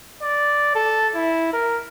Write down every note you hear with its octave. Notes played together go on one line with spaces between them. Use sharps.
D5
A4
E4
A#4